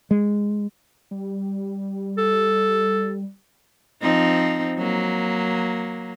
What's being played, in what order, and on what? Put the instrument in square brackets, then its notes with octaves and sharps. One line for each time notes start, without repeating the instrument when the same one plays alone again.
[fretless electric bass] G#3
[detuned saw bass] G3
[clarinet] A4
[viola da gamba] F3 C4 D#4
F#3 A#3